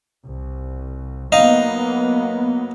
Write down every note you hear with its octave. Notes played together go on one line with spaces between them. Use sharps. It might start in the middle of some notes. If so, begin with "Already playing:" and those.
C2
F#3 A#3 B3 D#4 D#5 F5